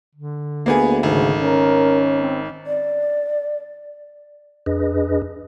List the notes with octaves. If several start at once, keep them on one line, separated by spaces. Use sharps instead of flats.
D3
D2 A#3 B3 G#4
G#1 C#3
C#4 A#4
C4
D5
F2 D4 G#4 B4 D#5